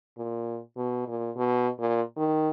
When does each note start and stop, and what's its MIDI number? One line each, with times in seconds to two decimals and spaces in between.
0.18 0.60 46
0.77 1.04 47
1.08 1.31 46
1.36 1.69 47
1.79 2.02 46
2.17 2.50 51